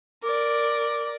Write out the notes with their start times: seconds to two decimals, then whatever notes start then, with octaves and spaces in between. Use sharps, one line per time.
0.23 A#4 D5 D6